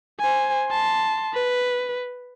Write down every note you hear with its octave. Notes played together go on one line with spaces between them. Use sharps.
C5 G#5
A5 C6
B4